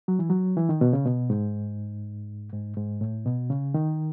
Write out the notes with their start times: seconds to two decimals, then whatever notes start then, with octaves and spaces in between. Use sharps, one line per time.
0.08 F#3
0.19 E3
0.30 F#3
0.57 E3
0.69 D#3
0.81 B2
0.93 C#3
1.05 B2
1.30 G#2
2.53 G#2
2.77 G#2
3.01 A2
3.25 B2
3.50 C#3
3.74 D#3